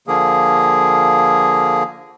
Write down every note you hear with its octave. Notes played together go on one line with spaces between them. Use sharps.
D3 F3 A#3 G#4